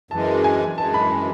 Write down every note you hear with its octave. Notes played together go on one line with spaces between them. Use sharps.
F#2 E3 G#3 A5
G#5
F#2 E3 G#3 A5
B5